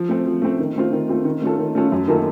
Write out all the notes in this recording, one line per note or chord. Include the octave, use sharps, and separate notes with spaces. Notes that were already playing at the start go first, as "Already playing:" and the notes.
Already playing: F3
A3 C4
F3
A3 C4
D#3
A3 C4 F4
D#3
A3 C4 F4
D#3
A3 C#4 F4 A4
D#3
A3 C#4 F4 A4
F#2
D#3 A#3 F4 A4